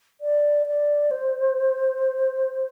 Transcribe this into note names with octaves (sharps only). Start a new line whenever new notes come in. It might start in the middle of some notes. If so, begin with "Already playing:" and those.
D5
D5
C5